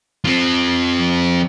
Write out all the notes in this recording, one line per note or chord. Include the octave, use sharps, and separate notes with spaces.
F3 C4